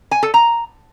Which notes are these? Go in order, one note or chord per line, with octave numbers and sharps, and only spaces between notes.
G#5
A4
A#5